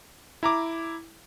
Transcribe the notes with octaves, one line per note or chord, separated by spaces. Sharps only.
E4 A#5 D6